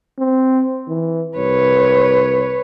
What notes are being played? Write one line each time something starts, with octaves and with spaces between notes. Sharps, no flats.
C4
E3
C2 B4 C#5